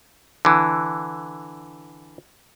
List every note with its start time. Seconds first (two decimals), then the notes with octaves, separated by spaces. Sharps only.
0.45 D3 E3